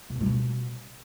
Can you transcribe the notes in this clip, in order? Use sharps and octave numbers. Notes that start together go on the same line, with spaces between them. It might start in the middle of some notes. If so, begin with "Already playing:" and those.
C3
A2
G3
B2